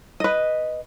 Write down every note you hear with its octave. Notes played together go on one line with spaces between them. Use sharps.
B4 D#5